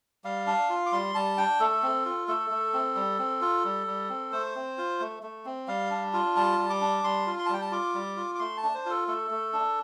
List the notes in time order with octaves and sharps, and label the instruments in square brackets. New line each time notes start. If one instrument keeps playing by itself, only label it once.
[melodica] G3 F5
D4
F4
D6
G3 C6
G3 A5
D4 G5
A3 A4
C4
F4
A3 A4
A3
C4
G3
C4
F4
G3
G3
C4
A3 C5
C4
F4
A3
A3
C4
G3 F5
D4
F4
G3 A5
G3
D6
D4
G3 C6
F4
C6
A5
G3 G5
A5
F4 D6
G3
F4
D6
A3 C6
A5
D4
C5
F4 A4
A3 A4
A3
D4